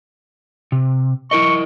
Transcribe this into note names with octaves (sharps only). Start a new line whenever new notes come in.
C3
E4 A#4 D#5 C#6